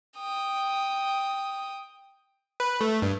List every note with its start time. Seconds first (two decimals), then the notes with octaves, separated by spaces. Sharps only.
0.19 G5 D#6
2.60 B4
2.81 A3
3.02 G2